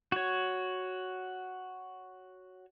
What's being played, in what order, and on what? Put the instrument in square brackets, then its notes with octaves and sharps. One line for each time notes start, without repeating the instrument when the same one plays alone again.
[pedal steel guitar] F#4 C#5